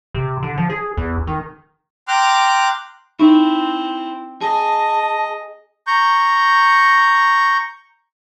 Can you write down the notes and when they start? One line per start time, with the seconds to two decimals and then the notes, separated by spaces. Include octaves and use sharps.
0.14 C3
0.43 D3
0.58 F3
0.70 G#4
0.97 E2
1.27 D#3
2.08 G5 A#5 C6 D6 F6 F#6
3.19 C4 D#4 E4
4.41 G#4 D#5 A5
5.87 A#5 C#6 G6